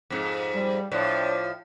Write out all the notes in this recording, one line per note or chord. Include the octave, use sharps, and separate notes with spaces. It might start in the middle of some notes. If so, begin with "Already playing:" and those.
F2 G#2
G3
A2 F3 D4 C5 D5